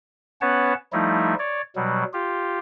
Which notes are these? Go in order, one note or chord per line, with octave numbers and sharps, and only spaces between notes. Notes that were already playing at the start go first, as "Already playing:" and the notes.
B3 C#4 B4 C#5 F#5 A5
F3 G3 A3 D#4 E4
C#5 D5
B2 F#3 G3
F4 G4